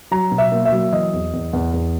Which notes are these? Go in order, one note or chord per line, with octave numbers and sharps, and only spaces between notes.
F#3 A#5
B2
E5
A#3
E5
F#3
E3 D#5
E2
E2
E2
E2